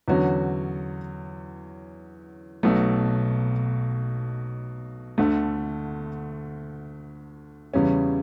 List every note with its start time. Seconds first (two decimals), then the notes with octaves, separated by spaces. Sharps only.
0.08 E2 D3 F#3 C#4 F#4
2.63 B1 B2 F#3 A3
5.18 D2 D3 A3
7.74 E2 C#3 G3 C#4